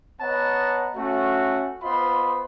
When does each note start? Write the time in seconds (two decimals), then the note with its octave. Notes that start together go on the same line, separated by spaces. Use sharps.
0.21 B3 C#5 D#5 F#5 A5 A#5
0.96 A3 C#4 F#4
1.83 B3 F4 C5 D#5 B5 C6